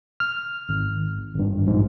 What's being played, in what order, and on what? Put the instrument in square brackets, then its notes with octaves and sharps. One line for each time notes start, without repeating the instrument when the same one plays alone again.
[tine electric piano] F6
G#1
G#1 G2
A#1 G#2